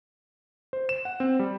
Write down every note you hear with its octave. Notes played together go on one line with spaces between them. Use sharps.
C5
E7
F#5
C4
G3